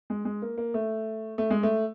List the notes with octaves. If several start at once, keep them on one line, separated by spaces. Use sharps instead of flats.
G#3
G#3
A#3
A#3
A3
A3
G#3
A3